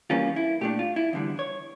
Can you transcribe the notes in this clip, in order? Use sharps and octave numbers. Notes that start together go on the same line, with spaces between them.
E2 E3 G3 A#3 C#4 F4
E4
A#2 A3 D4 G4
F4
E4
E2 D3 G3
C#5